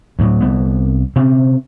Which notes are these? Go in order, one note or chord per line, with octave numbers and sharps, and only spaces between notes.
D2 A2 F#3
C2 G3 B3
C3 C4 C#4